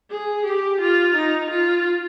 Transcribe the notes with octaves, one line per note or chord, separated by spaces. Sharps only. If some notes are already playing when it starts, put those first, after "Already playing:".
G#4
G4
F4
D#4
F4